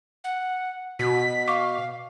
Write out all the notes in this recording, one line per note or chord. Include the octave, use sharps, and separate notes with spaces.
F#5
B2 F#4 B6
F5 C#6 D6